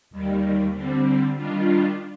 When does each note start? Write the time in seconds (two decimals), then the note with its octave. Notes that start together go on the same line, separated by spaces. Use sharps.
0.10 D#2 D#3 G3
0.73 D3 G3 C4
1.35 D#3 G3 D4 F4